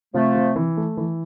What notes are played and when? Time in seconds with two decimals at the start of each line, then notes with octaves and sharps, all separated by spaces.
0.14 C3 F3 A3
0.35 C3
0.56 E3
0.77 A3
0.97 E3